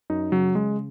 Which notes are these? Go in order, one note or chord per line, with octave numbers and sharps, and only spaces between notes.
F#2 D#4
C#3 F#3
C#3 G#3